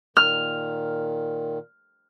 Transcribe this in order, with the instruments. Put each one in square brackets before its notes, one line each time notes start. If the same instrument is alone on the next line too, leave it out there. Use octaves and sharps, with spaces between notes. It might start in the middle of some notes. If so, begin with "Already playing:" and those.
[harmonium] A#2 D#3 [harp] F6